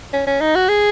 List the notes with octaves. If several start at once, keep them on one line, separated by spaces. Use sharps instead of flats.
C#4
C#4
D#4
F#4
G#4